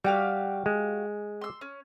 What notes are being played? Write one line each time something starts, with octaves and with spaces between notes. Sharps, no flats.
G3 F#4 G4 F5
G#3
C6 E6
C#4